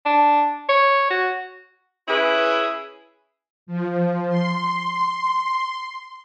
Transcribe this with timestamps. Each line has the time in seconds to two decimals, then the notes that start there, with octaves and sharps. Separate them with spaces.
0.05 D4
0.69 C#5
1.10 F#4
2.08 C#4 E4 G#4 B4
3.66 F3
4.29 C6